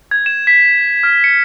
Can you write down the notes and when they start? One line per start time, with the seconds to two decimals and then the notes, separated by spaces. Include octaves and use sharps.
0.11 G#6
0.26 E7
0.47 B6
1.03 F6
1.24 C#7